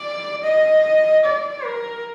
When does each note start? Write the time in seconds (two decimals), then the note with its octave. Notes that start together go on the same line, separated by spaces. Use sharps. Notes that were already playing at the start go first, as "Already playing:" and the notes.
Already playing: D5
0.44 D#5
1.25 D5
1.65 A#4